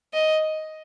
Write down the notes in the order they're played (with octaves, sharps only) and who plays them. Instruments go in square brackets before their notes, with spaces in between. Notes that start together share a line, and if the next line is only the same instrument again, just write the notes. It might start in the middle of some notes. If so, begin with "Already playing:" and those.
[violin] D#5